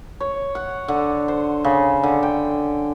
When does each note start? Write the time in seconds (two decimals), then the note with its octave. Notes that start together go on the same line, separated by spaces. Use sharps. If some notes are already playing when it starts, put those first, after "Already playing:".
0.20 C#5
0.55 F#5
0.88 D3
1.28 C5
1.65 C#3
2.03 D3
2.23 G5